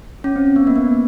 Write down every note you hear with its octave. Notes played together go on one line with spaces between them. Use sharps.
C#4
C4
B3
A#3
B3